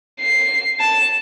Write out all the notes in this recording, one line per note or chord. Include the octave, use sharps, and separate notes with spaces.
C7
A5